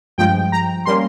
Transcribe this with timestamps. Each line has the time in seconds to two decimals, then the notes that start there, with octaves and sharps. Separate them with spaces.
0.18 G2 F3 G#3 G5
0.52 A#5
0.85 G3 A#3 C#4 C6